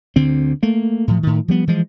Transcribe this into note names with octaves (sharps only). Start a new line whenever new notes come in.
D2 D3 C4
A3 A#3
A2 F3
A2 D#3
F3 G3 B3
E3 F3 G#3